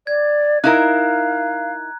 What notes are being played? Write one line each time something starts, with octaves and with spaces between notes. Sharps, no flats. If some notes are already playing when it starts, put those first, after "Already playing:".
D5 G#6
D#4 E4 A#4 F5 A#5 F#6